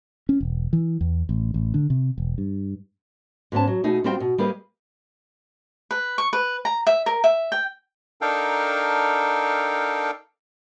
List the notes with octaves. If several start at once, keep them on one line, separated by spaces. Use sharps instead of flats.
C#4
E1
E3
E2
A1
A1
D3
C3
E1
G2
G#2 B3 C#4 A5
F#3
B2 A3 D#4 G#4
G3 B3 C4 F4 F#4 G5
B2
G3 A#3 G#4 B4 D#5
B4
C#6
B4
A#5
E5
A#4
E5
G5
D4 D#4 A4 A#4 F5 G5